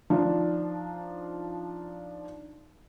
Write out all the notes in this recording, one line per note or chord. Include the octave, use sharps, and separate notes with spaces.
F3 D4 D#4 F4